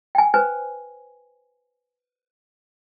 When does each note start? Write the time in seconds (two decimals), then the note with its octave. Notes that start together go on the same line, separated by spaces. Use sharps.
0.15 G5 G#5
0.34 B4 C5 G#5